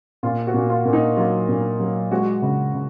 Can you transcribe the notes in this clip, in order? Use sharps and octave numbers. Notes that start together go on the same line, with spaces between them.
A#2 F4
F#4
A#2
F4
A#2
D#4
F#3 F4
A#2
F#3
G#3 F#4
C#3
C#3